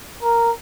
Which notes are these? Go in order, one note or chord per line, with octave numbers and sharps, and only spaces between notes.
A#4